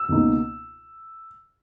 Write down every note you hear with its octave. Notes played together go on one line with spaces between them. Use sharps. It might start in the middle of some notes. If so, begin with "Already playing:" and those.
Already playing: E6
C#2 B2 A#3 D#4